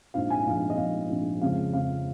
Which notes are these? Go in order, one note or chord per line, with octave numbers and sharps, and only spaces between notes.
A#1 G#2 F3 F5
G#5
A#1 G#2 F3 F5
D#5
A#1 G#2 F3 F5
A#1 G#2 F3
F2 C#3 F3 G#3 F5
F2 C#3 F3 G#3 F5